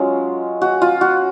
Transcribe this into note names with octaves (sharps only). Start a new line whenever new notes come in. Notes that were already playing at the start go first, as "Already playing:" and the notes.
Already playing: F#3 G#3 C#4 F4
F#4
F4
F#4